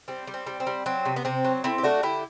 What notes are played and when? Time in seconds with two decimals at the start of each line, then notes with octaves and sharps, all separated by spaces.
0.08 G3 C4
0.27 G3
0.34 C4
0.47 G3
0.60 C4
0.67 G3
0.86 F#3 C4
1.05 C3
1.16 B3
1.25 C3 C4
1.45 F#3
1.64 A3 C4 E4
1.78 G4
1.83 A3 D4 F#4
2.03 D3 E4 G4